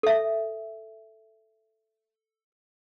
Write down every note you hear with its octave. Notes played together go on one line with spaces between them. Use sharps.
A4 E5